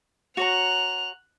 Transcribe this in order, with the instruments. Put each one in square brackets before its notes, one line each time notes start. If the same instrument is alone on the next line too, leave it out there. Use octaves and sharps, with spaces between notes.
[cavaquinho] F#4 C#5 A#5 [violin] F#6 F7